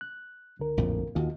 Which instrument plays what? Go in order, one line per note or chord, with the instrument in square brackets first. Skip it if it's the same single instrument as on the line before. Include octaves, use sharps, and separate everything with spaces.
[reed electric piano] F#6
C#2 D3 A#4
[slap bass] A#1 F2 A2
[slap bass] D#2 D#3 [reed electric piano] F4 F#4